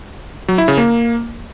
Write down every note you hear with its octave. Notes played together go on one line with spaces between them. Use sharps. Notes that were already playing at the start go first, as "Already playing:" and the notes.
F#3
E4
C#3
A#3